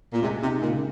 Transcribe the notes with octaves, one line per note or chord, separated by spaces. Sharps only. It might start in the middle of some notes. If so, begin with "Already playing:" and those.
A#2
C3 G#3
C3 D#4
A#2 C#3